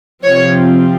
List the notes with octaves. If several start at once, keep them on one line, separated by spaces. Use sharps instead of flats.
C3 F3 C4 C#5